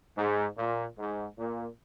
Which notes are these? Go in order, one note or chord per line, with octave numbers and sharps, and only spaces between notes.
G#2
A#2
G#2
A#2